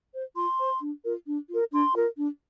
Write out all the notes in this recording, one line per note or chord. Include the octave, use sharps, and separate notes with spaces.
C5
F4 C6
C5
D4
F4 A#4
D4
F4 A#4
D4 C6
F4 A#4
D4